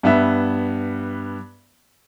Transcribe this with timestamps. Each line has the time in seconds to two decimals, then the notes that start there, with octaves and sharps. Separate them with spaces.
0.03 G2 B3 E5